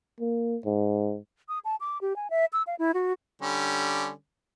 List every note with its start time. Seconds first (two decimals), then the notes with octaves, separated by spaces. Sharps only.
0.20 A#3
0.65 G#2
1.49 D#6
1.65 A5
1.80 D6
2.01 G4
2.16 G#5
2.30 E5
2.53 E6
2.67 F5
2.79 E4
2.94 F#4
3.42 D3 G3 C#4